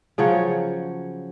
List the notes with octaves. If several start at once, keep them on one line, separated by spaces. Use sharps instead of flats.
C#3 F3 F#3 C#5